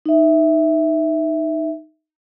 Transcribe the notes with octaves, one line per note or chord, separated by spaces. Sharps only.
D#4 E5